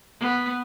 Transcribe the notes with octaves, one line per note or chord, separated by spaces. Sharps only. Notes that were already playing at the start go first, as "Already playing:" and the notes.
B3